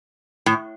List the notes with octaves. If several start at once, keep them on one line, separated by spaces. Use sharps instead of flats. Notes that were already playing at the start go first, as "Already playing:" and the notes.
A2